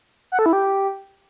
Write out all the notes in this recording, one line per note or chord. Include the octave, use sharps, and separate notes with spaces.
F#5
A4
E4
G4